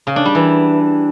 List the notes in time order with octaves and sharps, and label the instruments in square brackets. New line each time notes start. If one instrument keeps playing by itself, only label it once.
[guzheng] C#3
D4
G3
E3